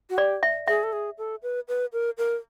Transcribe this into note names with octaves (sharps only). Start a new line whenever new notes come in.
F#4
G4 D5
E5
G#4 E5
A4
G#4
A4
B4
B4
A#4
A#4